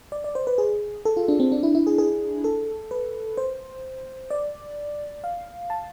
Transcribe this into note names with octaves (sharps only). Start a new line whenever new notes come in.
D5
D5
C5
B4
G#4
A4
F4
D4
C4
D4
E4
E4
G#4
G#4
A4
B4
C5
D5
F5
A5